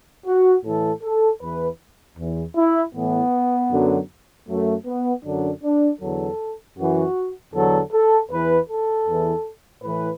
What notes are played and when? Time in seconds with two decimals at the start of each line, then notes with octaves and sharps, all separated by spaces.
0.27 F#4
0.65 A2 E3 A4
1.03 A4
1.41 E2 E3 B4
2.17 E2 E3
2.56 E4
2.94 A2 E3 B3
3.71 F#2 D3 F#3
4.48 F#2 F#3 A3
4.85 B3
5.23 F#2 D3 F#3 D4
5.63 D4
6.00 E2 D3 F#3 A4
6.77 F#2 E3 F#4
7.53 E2 D3 F#3 A4
7.92 A4
8.30 E2 E3 B4
8.68 A4
9.07 E2 E3
9.83 A2 E3 B4